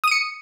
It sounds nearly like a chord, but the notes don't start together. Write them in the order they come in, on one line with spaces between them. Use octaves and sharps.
D#6 D#7 C#7